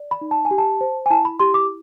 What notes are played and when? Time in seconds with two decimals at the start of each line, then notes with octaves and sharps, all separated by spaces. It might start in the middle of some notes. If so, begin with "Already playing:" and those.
Already playing: D5
0.11 B5
0.21 D#4
0.31 A5
0.45 G#5
0.51 G4
0.58 A5
0.81 C5
1.06 G#5
1.10 E4 A5
1.25 B5
1.40 G4 C6
1.54 D6